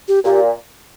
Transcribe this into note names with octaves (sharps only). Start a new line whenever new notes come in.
G4
A#2 G4